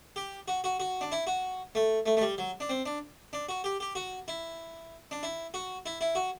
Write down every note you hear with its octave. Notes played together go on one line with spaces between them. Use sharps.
G4
F#4
F#4
F#4
D4
E4
F#4
A3
A3
A3
G3
F#3
D4
C4
D4
D4
F#4
G4
G4
F#4
E4
D4
E4
F#4
E4
E4
F#4